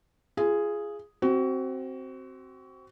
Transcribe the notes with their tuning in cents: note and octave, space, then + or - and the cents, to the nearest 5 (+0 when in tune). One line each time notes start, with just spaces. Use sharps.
F4 -30 G#4 +0
C4 +5 F#4 +25